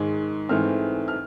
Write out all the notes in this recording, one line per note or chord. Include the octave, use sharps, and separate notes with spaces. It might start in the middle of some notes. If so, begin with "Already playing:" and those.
Already playing: G#2 D#3 G#3
G#2 E3 A3 C4 F6
F6